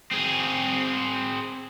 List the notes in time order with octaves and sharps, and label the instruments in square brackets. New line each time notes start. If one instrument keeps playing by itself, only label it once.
[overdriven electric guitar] C4 G#4